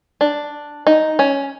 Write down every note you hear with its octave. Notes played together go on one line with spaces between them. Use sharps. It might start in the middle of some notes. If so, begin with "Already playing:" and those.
D4
D#4
C#4